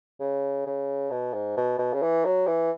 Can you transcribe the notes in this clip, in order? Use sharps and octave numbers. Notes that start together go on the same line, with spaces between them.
C#3
C#3
B2
G#2
B2
B2
C#3
E3
F#3
E3